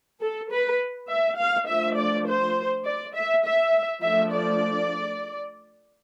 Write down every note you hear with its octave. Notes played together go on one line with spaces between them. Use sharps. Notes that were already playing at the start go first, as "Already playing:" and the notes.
A4
B4
E5
F5
F3 A3 D4 E5
D5
C5
D5
E5
E5
F3 A3 D4 E5
D5